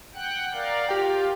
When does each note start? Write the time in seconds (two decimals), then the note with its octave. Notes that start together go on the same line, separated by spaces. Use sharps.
0.14 F#5 G5 F#6
0.53 A#4 D5 F5
0.89 F4 G4 G5